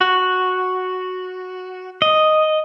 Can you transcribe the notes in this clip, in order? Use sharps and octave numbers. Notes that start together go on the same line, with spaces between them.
F#4
D#5